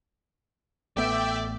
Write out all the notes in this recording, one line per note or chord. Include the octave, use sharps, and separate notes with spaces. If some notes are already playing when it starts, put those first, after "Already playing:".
A1 A3 B3 D5 E5 G5